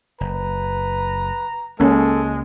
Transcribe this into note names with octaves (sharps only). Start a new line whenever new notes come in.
F#1 B4 A#5
C#2 G#3 A#3 C#4 A4